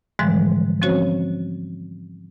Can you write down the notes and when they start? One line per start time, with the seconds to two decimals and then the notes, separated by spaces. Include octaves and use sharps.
0.19 G#2 D3 E3 F3 G3 G#3
0.82 F3 C4 C#4 F#4 C5 C#5